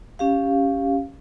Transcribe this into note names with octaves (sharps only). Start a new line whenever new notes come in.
C#4 G4 F5